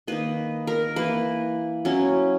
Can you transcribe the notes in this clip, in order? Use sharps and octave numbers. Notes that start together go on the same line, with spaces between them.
D#3 A#3 D#4 B4
A#4
E3 A#3 E4 B4
F#3 C#4 E4